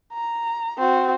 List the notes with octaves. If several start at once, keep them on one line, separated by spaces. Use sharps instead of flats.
A#5
C4 F#4